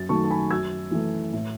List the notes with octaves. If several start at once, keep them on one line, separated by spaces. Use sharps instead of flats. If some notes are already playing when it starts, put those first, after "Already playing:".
Already playing: F#2 A6
D#3 F#3 A3 A5 C#6
A5
G#5 B5
F#2 E6 G#6
E3 A3
A2